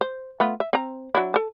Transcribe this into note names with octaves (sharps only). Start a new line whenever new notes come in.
C5
A3 B3 F4
E5
C4 A#5
F#3 D4 E4
A4 A5